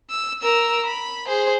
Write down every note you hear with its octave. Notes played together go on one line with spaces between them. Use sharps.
E6
A#4 E6
B5
G#4 C5